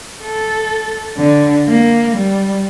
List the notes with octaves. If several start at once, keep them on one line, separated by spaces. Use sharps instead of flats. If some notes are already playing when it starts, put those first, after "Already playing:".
A4
D3
A#3
G3